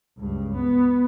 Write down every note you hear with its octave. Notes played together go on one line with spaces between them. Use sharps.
C#2 G2
B3